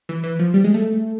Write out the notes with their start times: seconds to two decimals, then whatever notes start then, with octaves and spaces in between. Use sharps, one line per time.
0.09 E3
0.23 E3
0.39 F3
0.54 G3
0.64 G#3
0.74 A3